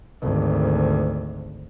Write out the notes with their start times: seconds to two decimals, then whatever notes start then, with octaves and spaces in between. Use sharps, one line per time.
0.22 G#1 D2